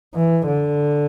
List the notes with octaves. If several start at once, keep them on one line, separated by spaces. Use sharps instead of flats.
E3
D3